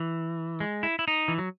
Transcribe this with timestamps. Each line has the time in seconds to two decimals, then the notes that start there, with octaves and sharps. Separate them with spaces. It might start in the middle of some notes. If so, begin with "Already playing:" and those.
Already playing: E3
0.60 G#3
0.83 E4
0.99 E4
1.08 D#4
1.28 E3
1.38 F#3